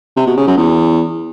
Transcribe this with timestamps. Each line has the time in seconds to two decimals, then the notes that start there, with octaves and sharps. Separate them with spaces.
0.16 C3
0.27 B2
0.37 C#3
0.47 F#2
0.57 E2